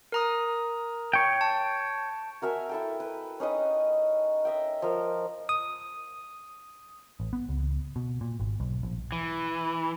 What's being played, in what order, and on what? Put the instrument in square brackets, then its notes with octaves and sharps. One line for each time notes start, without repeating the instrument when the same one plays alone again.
[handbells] A#4 A#5 D#6
[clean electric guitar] C#5 G5
[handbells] A5
[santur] F#4 A#4 E5 G#5
E4 A4 G5
B4
C#4 D#4 B4 D#5
D#5 E5 G5
F3 A#4
[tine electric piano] D#6
[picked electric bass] A1
B3
C#2
B2
A#2
G#1
B1
A#1
[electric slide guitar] E3